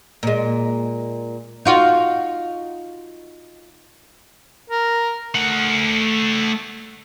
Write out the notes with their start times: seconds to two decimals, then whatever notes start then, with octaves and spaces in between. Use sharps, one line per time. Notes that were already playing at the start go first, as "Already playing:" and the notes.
0.23 A#2 G#3
1.65 D#4 F4 F#4
4.70 A#4
5.35 A3 F#5